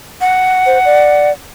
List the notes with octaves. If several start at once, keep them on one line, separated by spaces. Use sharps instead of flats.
F#5
C5
D5